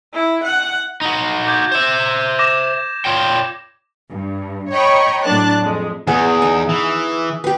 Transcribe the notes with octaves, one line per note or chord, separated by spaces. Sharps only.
E4
F#5
D#4 F#4
D6 G6 G#6
C5 E5
D6 A#6 E7
F4 C#5 G5
G2
C#5 D#5 G5 A#5 B5 C#6
A2 F#3 D4 A5 F#6 A6
F2 G#3
E2 B3 G#4 F#5 G#5
D#4
E3
G4 B4